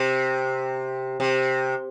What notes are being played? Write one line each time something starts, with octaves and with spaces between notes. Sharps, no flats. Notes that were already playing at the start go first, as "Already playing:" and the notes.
Already playing: C3
C3